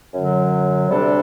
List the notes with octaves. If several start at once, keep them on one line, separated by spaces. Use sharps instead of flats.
F#2 D3 F#3
D2 C3 G3 D4 A4